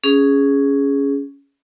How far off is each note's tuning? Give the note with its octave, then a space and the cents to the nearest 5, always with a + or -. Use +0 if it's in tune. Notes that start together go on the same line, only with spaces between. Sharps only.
C#4 +10 G#4 +0